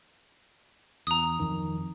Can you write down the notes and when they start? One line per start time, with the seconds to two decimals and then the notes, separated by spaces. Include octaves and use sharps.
1.07 E2 A#5 D#6
1.39 F2 D#3